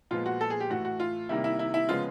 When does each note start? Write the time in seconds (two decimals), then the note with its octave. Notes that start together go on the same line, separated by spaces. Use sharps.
0.11 A#2 F3 G#3 B3 F4
0.26 F#4
0.41 A4
0.50 G#4
0.60 G4
0.70 A2 E3 A3 F#4
0.85 F#4
1.00 F4
1.29 C3 D#3 G3 A#3 E4
1.44 E4
1.59 E4
1.74 E4
1.89 C#3 F3 G#3 B3 F4